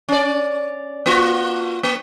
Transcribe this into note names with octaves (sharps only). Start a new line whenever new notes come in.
C#4 D5
A#3 F4 F#4
A#3